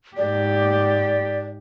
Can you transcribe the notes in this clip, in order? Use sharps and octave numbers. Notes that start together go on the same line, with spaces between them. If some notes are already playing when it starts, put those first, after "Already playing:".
G#2 G4 D5